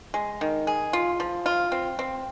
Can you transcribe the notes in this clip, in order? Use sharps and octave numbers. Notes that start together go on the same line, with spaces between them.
G#3
D#3
G#4
F4
F3
F4
C4
C4